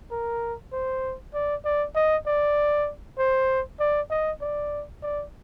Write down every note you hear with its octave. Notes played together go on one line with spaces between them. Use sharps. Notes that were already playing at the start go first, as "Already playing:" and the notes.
A#4
C5
D5
D5
D#5
D5
C5
D5
D#5
D5
D5